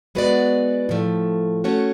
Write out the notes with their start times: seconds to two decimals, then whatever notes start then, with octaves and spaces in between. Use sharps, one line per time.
0.15 G#3 B3 F#4 B4 D5
0.89 A2 F3 A3
1.64 A3 C#4 F#4 C#5